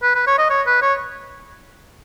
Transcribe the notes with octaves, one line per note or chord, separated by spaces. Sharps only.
B4
B4
C#5
D#5
C#5
B4
C#5